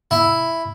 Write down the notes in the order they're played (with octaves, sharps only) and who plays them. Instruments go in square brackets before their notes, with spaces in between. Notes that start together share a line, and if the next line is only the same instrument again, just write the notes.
[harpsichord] E4